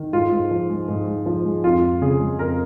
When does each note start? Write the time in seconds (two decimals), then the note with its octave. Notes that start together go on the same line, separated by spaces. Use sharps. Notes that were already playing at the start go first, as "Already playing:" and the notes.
Already playing: D#3
0.13 G#2 F4
0.32 G#2
0.51 F3
0.69 G#3
0.88 G#2
1.07 G#2
1.26 F3
1.45 G#3
1.64 F2 F4
1.82 F2
2.02 C#3 G#4
2.21 G#3
2.39 F2 A#4